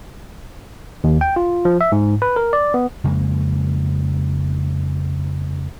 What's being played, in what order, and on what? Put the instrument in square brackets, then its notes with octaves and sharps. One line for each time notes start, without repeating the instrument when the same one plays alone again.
[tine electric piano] D#2
G5
F4
F3
E5
G#2
B4
A#4
D5
B3
[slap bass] F2 C#3 G#3 A#3